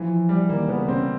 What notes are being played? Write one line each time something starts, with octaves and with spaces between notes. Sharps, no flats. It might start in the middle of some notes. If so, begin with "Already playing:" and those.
Already playing: E3 F3
G3
D#3 A#3
C#3 B3
C#3 C4